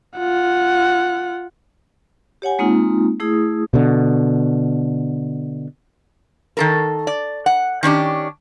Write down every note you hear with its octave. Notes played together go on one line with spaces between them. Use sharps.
F4 F#5
G4 C#5 F#5 G#5
G#3 A#3 C4 D#4 F4
A3 E4 G#4 D#6
B2 D3
D#3 A4 A#4
D5
F#5
D#3 C#4 D4 G4